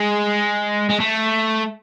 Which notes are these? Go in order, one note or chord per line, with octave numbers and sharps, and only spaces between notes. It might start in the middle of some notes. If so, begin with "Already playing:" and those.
Already playing: G#3
G#3
A3